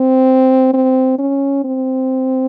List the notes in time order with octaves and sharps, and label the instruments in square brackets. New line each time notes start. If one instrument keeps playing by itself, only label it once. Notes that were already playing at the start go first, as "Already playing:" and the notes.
Already playing: [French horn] C4
C4
C#4
C4